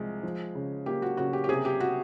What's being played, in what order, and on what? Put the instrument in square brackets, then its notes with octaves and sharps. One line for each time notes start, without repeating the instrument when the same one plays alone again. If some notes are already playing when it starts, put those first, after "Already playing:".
Already playing: [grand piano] C2 F3 G#3
F3
C#3
[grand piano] A#3 [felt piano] G4
[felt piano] F#4
[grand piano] C#3 [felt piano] F#4
[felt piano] G4
G4
[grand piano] C3 [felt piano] G#4
[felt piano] G4
F#4